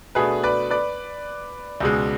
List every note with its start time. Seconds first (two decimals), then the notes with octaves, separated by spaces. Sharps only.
0.15 B2 A3 D4 G#4 B4
0.43 B4 D5
0.70 B4 D5
1.80 C#2 B2 G#3